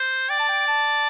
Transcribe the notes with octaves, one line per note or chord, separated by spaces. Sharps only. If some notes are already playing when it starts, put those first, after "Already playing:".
Already playing: C5
D5 G5
A5
G5
A5